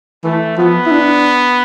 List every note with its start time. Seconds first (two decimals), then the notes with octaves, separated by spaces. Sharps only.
0.24 E3 A3
0.58 F3 B3
0.86 E4
0.91 D4